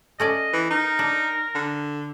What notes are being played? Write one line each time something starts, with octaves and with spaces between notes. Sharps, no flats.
A3 C#4 D5 D#5
E3
D#4 A#4
D4
D3